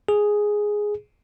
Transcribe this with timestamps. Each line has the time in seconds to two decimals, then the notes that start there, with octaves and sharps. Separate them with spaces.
0.09 G#4